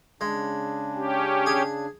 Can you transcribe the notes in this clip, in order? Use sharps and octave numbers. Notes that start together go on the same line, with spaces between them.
C#3 G#3 D4
C#4 G4
G#4